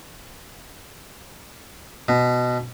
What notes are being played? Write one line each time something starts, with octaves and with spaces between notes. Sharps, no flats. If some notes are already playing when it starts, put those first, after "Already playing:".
B2